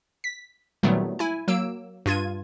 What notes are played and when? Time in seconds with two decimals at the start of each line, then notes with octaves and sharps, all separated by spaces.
0.24 B6
0.83 A#2 D#3 F#3 G3 A3 B3
1.19 E4 G#5
1.48 F#3 A#3 E6 D7
2.06 G2 F4 G#6 D#7